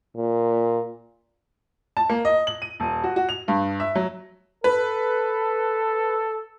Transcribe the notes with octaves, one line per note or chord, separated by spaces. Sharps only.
A#2
A5
A#3
D#5
F#7
D#7
D#1
F#4
F#4
F7
G2
E5
F#3
A4 B4